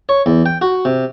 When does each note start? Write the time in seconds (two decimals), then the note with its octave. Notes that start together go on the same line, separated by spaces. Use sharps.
0.09 C#5
0.26 E2
0.46 G5
0.62 F#4
0.85 C3